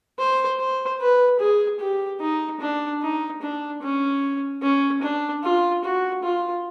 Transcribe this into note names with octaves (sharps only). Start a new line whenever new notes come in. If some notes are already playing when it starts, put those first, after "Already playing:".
C5
C5
B4
G#4
G4
D#4
D4
D#4
D4
C#4
C#4
D4
F4
F#4
F4